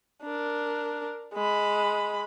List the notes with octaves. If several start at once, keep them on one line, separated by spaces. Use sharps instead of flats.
D4 A#4
G#3 B5